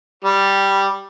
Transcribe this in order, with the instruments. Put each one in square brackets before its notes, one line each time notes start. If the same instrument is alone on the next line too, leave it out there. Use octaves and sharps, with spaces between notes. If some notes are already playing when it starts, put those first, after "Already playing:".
[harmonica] G3